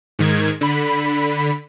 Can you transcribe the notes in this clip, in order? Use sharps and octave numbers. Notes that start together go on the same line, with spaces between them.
G#2 D#3 G#6
D3 B5